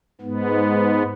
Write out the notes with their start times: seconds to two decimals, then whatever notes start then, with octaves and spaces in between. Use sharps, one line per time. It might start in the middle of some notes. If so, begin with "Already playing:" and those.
0.21 G#2 B3